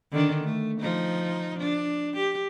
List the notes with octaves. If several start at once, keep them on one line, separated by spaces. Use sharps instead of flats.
D3 D#3 D4
A3
F3 D#4
D4
G4